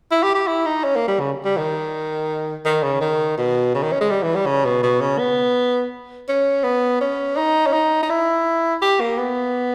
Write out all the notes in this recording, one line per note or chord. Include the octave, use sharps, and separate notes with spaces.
E4
G4
G4
E4
D#4
C#4
A#3
G3
C#3
G3
D#3
D#3
C#3
D#3
B2
C#3
D#3
C#4
G#3
G3
E3
G3
C#3
B2
B2
C#3
B3
C#4
B3
C#4
D#4
C#4
D#4
D#4
E4
G4
A#3
B3